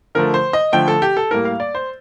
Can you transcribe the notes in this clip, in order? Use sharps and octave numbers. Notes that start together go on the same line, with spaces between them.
D3 F3 A3 A#4
C5
D#5
D3 F3 A3 G5
A4
G4
A4
A2 G3 A#3 A#4
F5
D5
C5